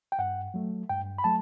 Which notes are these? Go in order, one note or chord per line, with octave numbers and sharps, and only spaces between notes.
G5
G2 F#5
F#3 A3
G2 G5
B5
F#3 A3 A5